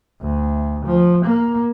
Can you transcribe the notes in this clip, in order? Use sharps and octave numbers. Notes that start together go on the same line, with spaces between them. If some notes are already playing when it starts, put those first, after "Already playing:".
D2
F3
A#3